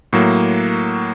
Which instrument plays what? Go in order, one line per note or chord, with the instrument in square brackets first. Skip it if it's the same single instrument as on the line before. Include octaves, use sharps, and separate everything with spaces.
[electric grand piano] A2 F#3 A#3